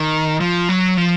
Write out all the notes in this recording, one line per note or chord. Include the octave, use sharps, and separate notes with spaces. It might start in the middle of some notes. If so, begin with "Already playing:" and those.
Already playing: D#3
F3
F#3
F3